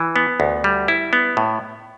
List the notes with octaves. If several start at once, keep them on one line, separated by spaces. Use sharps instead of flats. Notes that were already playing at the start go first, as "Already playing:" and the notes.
Already playing: E3
B3
D2
G3
E4
B3
A2